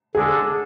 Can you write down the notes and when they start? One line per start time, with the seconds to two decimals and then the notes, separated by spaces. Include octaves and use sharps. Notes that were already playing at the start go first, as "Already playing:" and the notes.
0.15 D3 G#3 D4 G#4 A4